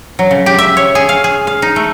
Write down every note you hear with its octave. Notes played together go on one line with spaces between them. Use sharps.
F#3
C#3
G4
E5
C#5
G#4
F5
G#4
F5
D#4
A3